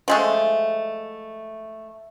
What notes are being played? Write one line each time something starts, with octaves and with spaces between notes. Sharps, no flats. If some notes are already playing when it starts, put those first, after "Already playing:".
F3 G#3 A3